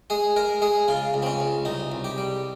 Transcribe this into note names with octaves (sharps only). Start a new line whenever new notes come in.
G#3 G#4
G#3 A#4
G#3 G#4
C#3 F4
C#2
C4
C#4
C#2
C2 D#4
C2
G4
G3